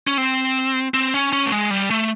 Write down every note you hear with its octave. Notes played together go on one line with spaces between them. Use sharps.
C#4
C4
C4
C#4
C#4
A3
G#3
G3
A3